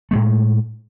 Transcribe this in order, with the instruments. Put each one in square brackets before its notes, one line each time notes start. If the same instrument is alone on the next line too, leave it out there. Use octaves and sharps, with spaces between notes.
[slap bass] A2 G#3 A3